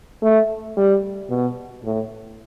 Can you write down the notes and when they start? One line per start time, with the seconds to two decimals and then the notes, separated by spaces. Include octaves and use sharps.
0.22 A3
0.77 G3
1.30 B2
1.84 A2